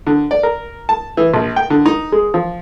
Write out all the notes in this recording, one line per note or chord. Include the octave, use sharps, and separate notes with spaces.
D3
D5
A#4
A5
E3
A#1
G5
D3
D#4
G#3
F3